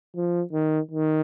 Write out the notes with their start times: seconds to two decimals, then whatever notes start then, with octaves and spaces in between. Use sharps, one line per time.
0.16 F3
0.53 D#3
0.91 D#3